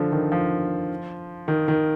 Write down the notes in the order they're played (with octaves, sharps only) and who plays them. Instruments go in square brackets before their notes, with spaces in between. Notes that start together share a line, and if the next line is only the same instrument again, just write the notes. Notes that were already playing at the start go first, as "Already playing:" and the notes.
Already playing: [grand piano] D3 F3
D#3
F3
D#3
D#3